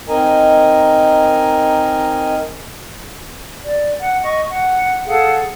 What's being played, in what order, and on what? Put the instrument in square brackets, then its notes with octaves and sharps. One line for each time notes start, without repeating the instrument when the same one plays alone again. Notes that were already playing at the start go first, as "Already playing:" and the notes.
[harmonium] C4 D#4 A#4 D#5 G#5 A#5
[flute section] D5
F#5
D#5 C#6
F#5
G#4 A4 F5 F#5